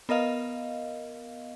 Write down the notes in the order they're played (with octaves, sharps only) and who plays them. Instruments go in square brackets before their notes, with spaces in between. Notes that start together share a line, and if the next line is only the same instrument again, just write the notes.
[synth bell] B3 A#4 D#5 F5